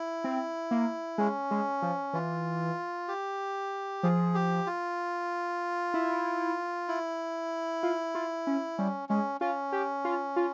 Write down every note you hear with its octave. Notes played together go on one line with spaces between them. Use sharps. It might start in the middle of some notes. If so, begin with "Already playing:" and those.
Already playing: E4
C4
A#3
G#3 C#4
G#3
F3
E3 F4
G4
F3 G#4
G4
F4
E4
E4
F4
F4
C#4
G3 C#4
G#3 C#4
C#4 F4
G4
F4
F4